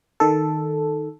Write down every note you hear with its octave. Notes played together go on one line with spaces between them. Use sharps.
D#3 A4